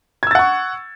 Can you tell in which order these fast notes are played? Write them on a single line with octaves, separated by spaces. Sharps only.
G#6 E6 A6 F#5 C#6